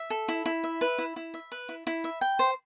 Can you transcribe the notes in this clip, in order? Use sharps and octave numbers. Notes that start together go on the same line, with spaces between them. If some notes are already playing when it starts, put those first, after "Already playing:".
Already playing: E5
A4
E4
E4
E5
B4
E4
E4
E5
B4
E4
E4
E5
G5
C5